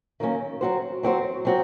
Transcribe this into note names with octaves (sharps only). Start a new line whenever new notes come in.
D#3 F#3 A#3 C#4
F#3 C4 F#4 C5
F#3 C4 F#4 C5
F#3 C4 F#4